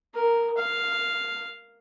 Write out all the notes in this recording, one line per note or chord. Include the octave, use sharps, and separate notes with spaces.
A#4
F5